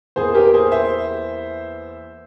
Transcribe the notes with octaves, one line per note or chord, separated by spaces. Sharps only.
E2 E3 A#3 G#4 C5
G4 A#4
G#4 C5
C5 E5